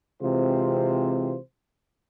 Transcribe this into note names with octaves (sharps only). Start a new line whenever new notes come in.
C3 E3 G#3 C4 F4 C5